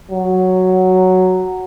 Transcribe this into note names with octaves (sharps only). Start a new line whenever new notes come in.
F#3